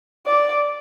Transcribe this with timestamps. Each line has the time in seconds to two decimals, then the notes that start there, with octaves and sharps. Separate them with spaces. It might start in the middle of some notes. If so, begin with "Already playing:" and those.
0.27 D5